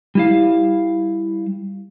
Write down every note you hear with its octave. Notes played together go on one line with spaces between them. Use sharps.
G3 E4 F5